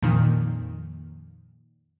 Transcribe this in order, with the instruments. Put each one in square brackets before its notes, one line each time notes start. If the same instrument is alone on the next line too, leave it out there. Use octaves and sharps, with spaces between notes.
[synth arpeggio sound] F2 A#2 D#3